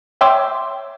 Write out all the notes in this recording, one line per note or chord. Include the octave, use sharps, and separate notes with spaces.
C#5 E5 G5 C6 D6 E6